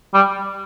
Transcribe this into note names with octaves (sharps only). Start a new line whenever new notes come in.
G3